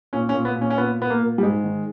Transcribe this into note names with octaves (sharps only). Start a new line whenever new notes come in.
A#2 C#4
C#4
A#2
B3
A#2 C#4
C#4
A#2 B3
A#2 B3
A#3
A#2
G3
G#2 G#3
D#3